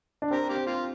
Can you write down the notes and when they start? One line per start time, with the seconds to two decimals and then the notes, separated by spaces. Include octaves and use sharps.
0.22 D4
0.31 C4 G4 A#4
0.49 A#3 G4
0.55 C4
0.66 A#3 F4